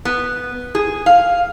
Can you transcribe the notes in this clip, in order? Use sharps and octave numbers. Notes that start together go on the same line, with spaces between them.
B3
G#4
F5